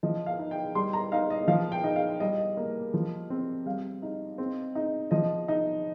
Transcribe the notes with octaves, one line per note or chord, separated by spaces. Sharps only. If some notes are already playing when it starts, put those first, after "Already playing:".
F3 D#5
F5
D#4
G5
G3 C6
A#5
D#4 F5
D#5
F3 F5
G5
D#4
F5
G3 D#5
D#5
A#3
F3
C4
G3 F5
D#4
C4
D#4
F3 D#5
D#4